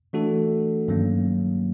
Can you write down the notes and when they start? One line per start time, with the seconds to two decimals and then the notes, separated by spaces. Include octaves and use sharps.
0.13 E3 A3 D4 F#4 A4
0.88 G2 D#3 F#3 A#3 C#4